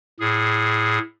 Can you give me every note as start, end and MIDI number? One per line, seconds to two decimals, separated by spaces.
0.20 0.99 45
0.20 0.99 68